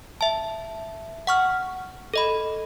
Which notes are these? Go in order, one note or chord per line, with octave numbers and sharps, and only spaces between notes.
E5 A5
F#5 C#6 F6
A4 D#5 B5